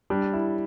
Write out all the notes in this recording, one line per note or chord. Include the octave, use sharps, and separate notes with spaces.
G3 D4
E4